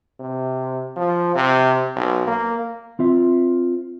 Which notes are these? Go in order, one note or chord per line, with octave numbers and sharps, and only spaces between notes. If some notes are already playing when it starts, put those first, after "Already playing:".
C3
F3
C3
B1
A#3
C4 F4 E5